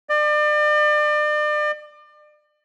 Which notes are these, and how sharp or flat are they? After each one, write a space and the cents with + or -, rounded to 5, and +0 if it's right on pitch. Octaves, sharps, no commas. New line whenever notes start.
D5 +35